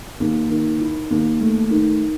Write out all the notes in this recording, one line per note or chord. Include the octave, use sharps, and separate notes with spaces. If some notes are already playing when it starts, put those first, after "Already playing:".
D#2
D#3
E4
D#2
A3
D#3